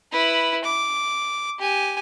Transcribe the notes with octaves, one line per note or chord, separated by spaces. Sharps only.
E4 B4
D6
G4 G#5